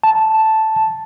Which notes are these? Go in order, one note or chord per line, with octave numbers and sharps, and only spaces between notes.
A5